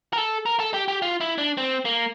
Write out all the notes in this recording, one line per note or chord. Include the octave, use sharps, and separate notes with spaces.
A#4
A4
A#4
A4
G4
G4
F4
E4
D4
C4
A#3